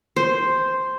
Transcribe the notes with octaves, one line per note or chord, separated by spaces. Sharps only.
C5